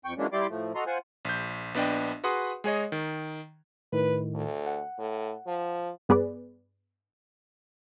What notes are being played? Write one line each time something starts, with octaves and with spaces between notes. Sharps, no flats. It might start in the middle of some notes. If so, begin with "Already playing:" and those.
F2 G5 C#6
E3 F#3 G#3 A#3 C#4 D4
G3 E4 G4 D5 C6 D6
A2 F3 A3
F#4 A4 D#5 A#5 C6
F4 C5 F#5 G#5
A#1 G6
A#1 B3 D4 D#5 G5
F#4 G#4 B4 F#5 C6 D#6
G#3 G#4 C#5 D#5
D#3
A2 D#3 B4
D2
F#5
A2
F3
G2 B3 G#4 B4 D5